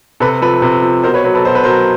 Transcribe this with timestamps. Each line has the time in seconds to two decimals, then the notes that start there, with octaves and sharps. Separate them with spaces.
0.20 C3 A4 B4
0.42 F3 A4 B4
0.62 C3 A4 B4
0.82 F3
1.03 B2 A#4 C5
1.14 B4 C#5
1.24 F#3 B4 C#5
1.35 A4 B4
1.45 B2 C5
1.55 B4
1.63 F#3 A#4 C5